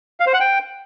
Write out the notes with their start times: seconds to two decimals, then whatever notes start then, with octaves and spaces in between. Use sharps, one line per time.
0.20 F5
0.27 C5
0.34 F#5
0.40 G5